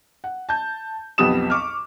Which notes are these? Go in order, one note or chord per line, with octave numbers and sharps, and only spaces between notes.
F#5
A5 G6
B1 F2 B3 G4 D#6 E7
C#6 D6 F6